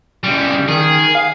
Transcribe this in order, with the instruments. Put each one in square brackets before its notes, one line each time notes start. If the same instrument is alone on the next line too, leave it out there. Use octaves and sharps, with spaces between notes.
[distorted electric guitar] C#3 G3
[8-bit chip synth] D#3 [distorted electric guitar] G#4
[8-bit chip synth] F5